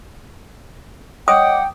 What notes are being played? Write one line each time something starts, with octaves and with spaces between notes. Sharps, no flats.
C#5 D#5 F#5 G5 D6 D#6